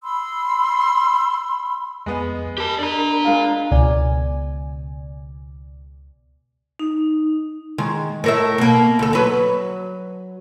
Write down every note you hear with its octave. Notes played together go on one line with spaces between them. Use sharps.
B5 C6 E6
F2 G#3 B3
G4 A#4 A5 B5
D4 D5 A#5
G#3 F4 F5
C#2 B2 D5 G#5
D#4
D#3 G#3
A2 A#4 E5
B2 A#3
D2 A4
F#3 B4